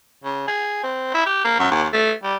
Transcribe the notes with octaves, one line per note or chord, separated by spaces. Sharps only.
C#3
G#4
C4
E4
G4
A#3
F#2
D#2
A3
G3